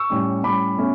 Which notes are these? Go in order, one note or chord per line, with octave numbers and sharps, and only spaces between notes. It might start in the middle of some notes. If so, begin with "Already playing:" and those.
Already playing: C#6 E6
A2 G3 C#4
A2 G3 C#4 B5 D6
B2 A3 C#4